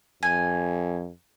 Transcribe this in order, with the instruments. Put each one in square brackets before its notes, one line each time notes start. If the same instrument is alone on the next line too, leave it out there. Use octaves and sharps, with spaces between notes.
[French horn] F2 [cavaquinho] G#5